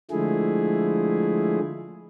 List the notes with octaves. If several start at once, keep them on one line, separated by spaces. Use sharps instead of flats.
D3 F3 G#3 A3 E4 G#4